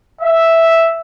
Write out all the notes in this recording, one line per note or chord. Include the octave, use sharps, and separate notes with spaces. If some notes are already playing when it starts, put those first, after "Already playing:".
E5